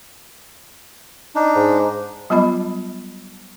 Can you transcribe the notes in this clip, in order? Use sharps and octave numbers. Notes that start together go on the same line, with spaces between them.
D4 D#4
G#2
F#3 G3 B3 F4 D#5 B5